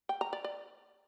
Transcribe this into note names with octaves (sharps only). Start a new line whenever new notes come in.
G5
A#5
D5
D5